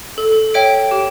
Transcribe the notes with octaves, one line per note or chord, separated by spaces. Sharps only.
A4
C#5 E5 G5 D7
G4